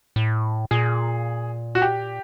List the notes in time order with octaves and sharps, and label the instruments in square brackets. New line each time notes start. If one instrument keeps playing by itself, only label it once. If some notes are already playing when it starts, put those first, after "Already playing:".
[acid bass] A2
[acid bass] A#2 [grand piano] G#4
[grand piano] F#4
G4